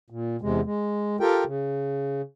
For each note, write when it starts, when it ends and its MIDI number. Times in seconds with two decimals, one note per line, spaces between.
0.10 0.37 46
0.42 0.61 40
0.42 0.61 48
0.42 0.61 56
0.64 1.17 56
1.20 1.44 65
1.20 1.44 67
1.20 1.44 69
1.20 1.44 70
1.20 1.44 79
1.46 2.22 49